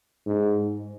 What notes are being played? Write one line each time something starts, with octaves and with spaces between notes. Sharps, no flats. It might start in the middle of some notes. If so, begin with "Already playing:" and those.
G#2